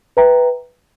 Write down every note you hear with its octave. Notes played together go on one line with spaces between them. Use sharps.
B4 E5 G5 A#5